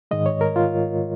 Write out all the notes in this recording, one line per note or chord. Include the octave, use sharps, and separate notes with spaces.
G#2 D#3 G#3 D#5
C#5
A#4
F4